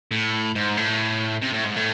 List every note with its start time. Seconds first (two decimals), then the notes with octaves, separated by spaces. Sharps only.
0.11 A2
0.55 G#2
0.77 A2
1.43 C3
1.54 A2
1.66 G#2
1.77 A2